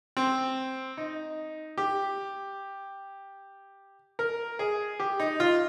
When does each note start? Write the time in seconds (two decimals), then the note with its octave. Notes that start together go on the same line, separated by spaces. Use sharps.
0.17 C4
0.97 D#4
1.78 G4
4.19 A#4
4.59 G#4
5.00 G4
5.20 D#4
5.40 F4